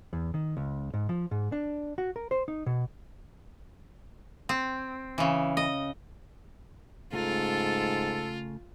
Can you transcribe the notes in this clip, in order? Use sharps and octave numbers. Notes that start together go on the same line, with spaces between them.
E2
D#3
C#2
G#2
F3
G#2
D4
F#4
A#4
C5
D#4
B2
C4
C#3 E3
D#5
G#2 C#3 A3 F4 A4 A#5